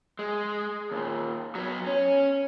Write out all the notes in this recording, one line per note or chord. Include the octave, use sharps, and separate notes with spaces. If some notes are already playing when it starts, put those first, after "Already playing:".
G#3
D#2 A#2
F#3 B3
C#4